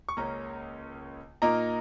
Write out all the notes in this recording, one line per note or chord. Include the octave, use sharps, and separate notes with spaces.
C#6
C#2 C#3 A#3 C#4 A#5
A#2 A#3 D#4 A#5